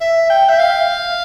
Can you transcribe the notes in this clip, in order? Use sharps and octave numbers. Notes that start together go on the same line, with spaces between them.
E5
G5
E5
F5